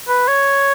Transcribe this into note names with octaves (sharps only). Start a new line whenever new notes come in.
B4
C#5